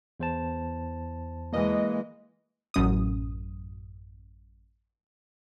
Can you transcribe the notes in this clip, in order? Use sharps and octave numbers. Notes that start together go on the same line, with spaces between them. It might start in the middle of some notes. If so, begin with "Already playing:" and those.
E2 C5 A5
E3 G#3 A#3 D#5
A1 F#2 D#6